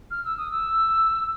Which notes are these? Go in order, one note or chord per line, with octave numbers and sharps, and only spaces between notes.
F6
E6
D#6
E6